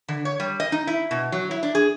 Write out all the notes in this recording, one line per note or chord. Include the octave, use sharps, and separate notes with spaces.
D3
C#5
G3
D#5
D#4
E4
B2
F#3
E4
D4
G#4